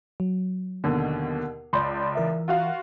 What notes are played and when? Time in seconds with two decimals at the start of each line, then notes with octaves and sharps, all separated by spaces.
0.20 F#3
0.84 D#2 B2 D3
1.73 C#2 D5 B5 C6 G6
2.15 E3 A#4 E5
2.48 F4 F#4 F5